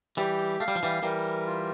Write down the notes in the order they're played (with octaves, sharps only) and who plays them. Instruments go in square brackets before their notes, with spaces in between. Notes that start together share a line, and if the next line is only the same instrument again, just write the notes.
[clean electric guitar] E3 G3 [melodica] G4
[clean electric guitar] A3 [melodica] F5
[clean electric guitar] G3
F3
E3 G3
[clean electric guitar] E3 G3 [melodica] A#4
[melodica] F4